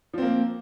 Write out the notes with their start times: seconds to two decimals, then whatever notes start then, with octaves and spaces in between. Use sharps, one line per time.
0.13 F3
0.18 C4
0.22 A#3